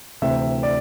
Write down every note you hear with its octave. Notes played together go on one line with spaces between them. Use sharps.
D2 C3 E3 C4 E4 E5
D5